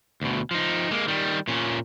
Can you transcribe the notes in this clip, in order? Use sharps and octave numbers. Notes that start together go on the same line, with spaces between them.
D2 B2
F3 D#4
G#3 A#3
D#3 G3
A#2 C#4